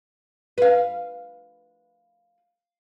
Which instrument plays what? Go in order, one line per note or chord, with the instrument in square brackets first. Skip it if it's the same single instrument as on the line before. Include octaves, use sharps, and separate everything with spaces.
[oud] B4 F5